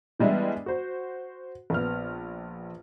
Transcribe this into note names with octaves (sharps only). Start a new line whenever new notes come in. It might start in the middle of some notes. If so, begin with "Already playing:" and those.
E3 G3 G#3 B3 D4 E4
F#4 C5
A#1 B3 F6